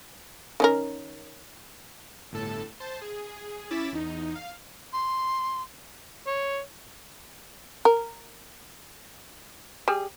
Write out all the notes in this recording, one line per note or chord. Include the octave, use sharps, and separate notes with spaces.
D#3 C#4 A#4
G1 A2 A4 A5
C5 A5
G#4
C#4 E4 D6 A6 B6 E7
E2 D#4
F5
C6
C#5
A#4
G3 G#4